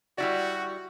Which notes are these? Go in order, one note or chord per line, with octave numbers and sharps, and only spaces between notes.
G3 E4 F#4 D5